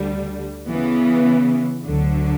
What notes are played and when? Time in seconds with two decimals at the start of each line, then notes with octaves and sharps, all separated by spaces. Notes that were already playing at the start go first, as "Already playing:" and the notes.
Already playing: D2 D3 G3
0.67 C#3 E3 B3
1.84 D2 D3 F#3